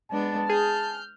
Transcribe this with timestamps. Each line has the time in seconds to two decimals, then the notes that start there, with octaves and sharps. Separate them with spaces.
0.11 G#3 B3 D4 A5
0.49 G#4 F6 G6